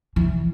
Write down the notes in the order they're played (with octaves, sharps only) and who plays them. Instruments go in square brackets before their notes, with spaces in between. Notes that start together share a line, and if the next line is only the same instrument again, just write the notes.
[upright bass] E3